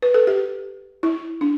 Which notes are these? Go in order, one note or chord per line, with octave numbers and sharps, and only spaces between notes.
B4
A4
G4
E4
D4